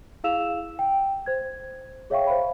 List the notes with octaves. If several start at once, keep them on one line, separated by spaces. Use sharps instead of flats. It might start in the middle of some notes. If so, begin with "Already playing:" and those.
E4 G#4 F5 E6 E7 F7
G5
C5 G#6
G#4 C#5 E5 F5 G5 C#6
C5 E5 F5 B5